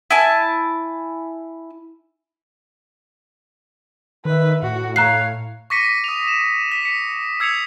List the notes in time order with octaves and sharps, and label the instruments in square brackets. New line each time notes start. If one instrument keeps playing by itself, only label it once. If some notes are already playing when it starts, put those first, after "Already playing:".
[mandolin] E4 G#5 A5
[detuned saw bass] D#3 [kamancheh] B4 E5
[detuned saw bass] A2 [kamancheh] F#4
[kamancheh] C#5 F5 [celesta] A#5 F#6 C7
[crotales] C#6 D6 A#6 B6 C#7 D#7
D#6 F7
E7
B6
C#7
E6 G#6 C7 C#7 F7